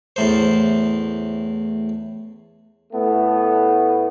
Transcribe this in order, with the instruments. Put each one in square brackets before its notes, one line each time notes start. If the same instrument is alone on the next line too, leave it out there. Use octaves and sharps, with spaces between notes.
[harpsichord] E2 A2 C5
[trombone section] A2 A3 B3